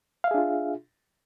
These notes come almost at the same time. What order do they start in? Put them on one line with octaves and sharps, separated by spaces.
F5 E5 G#4 D4 F4